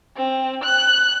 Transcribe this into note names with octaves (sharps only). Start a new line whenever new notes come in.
C4
F#6